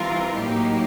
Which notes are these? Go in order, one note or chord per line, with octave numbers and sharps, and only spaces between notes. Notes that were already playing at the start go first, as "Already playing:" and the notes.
Already playing: E3 G3 C4 F4 A#4
A2 F#3 A#3 D#4 G4